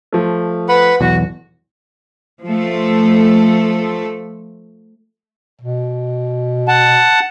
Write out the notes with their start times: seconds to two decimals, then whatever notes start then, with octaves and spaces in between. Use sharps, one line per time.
0.13 F3 A3
0.69 B4 F#5 B5
1.00 B1 E2 F#4
2.43 F3 A3 A4
5.61 B2
6.68 F#5 A5